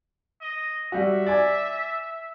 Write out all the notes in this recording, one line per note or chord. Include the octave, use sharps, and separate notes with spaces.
D#5
G3 F#4 E5
D5 G#5